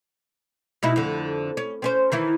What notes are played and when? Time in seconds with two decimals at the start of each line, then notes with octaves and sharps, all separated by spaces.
0.83 B2 D#4 E4
0.96 F2 D3
1.57 C#4
1.82 C4 C#4 C5
2.12 D#3 E3 E4